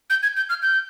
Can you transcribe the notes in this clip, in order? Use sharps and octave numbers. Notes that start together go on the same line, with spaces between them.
G6
G#6
G6
F6
G6